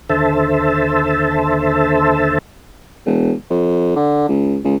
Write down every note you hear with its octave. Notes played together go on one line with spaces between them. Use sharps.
D#2 D3 A4 C5 E5 A5
E1
F2
D3
C#2
C#2